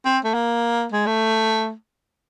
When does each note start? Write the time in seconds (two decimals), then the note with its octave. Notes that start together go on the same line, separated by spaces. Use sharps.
0.05 C4
0.24 A3
0.34 A#3
0.92 G#3
1.07 A3